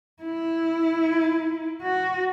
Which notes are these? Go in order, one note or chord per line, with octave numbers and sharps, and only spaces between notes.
E4
F#4